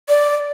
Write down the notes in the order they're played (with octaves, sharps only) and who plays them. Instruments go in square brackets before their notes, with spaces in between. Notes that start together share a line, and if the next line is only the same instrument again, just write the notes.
[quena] D5